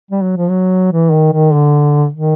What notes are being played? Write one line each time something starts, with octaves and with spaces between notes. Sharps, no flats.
G3
F#3
F3
F#3
E3
D#3
D#3
D3
D#3